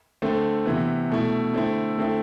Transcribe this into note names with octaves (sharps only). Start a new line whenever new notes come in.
D3 A3 C4
C3 E3 B3
B2 A3 E4
D3 A3 C4 E4
D3 A3 C4 E4